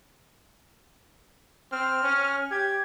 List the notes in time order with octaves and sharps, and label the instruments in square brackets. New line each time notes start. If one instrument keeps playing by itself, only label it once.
[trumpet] C4 [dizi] F6
[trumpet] C#4
[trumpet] G4 [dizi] G#6